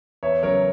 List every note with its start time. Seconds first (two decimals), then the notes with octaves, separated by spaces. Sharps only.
0.23 E2 C#5 E5
0.43 C#3 F#3 A#4 C#5